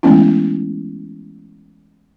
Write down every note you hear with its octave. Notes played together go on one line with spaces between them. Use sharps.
E3 G#3 A3 B3 C#4 E4